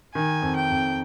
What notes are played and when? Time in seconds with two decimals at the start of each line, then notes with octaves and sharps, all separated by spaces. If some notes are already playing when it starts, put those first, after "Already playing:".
0.15 D#3 G#5
0.42 F2
0.56 G5
0.70 F2